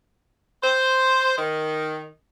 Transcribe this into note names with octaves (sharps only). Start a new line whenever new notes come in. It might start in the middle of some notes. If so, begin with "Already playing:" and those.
C5
D#3